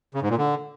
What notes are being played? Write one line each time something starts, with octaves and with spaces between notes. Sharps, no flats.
C#3
G#2
A#2
D3